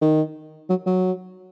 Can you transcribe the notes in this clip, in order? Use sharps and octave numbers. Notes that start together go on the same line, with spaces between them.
D#3
F#3
F#3